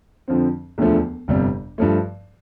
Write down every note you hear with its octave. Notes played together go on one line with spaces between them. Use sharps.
F2 D3 F3 C4
E1 D2 D3 F3 A3
G1 F2 C3 G3
G2 F3 A3